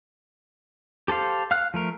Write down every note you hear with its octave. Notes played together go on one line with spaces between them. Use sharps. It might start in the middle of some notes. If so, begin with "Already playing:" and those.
G4 A4 C5 F5
F5 F6 F#6
F3 A3 A#4